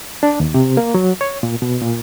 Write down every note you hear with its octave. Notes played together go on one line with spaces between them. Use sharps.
D4
D#2
C3
A#3
F#3
C#5
A#2
B2
A#2